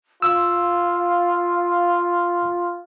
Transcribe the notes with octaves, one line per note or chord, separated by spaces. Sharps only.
F4 F5 E6